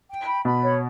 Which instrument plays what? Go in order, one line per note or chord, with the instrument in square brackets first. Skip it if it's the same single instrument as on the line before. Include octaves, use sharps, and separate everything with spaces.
[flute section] G5
B5
[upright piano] B2 [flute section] B5
[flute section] C#5